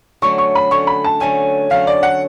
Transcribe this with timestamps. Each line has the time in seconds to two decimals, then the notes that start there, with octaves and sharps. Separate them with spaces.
0.22 D3 F#3 A3 C#4 C#6
0.38 C#6
0.55 B5
0.71 D3 F#3 A3 C#4 C#6
0.87 B5
1.04 A5
1.20 D3 F#3 A3 C#4 G#5
1.70 D3 F#3 A3 C#4 F5
1.87 D5
2.03 F#5